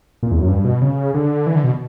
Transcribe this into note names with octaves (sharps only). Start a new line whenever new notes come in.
A#2
E2
F#2
G2
B2
C#3
D3
E3
D3
B2